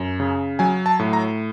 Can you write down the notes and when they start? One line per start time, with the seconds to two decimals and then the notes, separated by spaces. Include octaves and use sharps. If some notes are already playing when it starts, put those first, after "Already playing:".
Already playing: F#2
0.20 C#3
0.59 F#3 G#5
0.86 A5
0.99 A2
1.13 A#5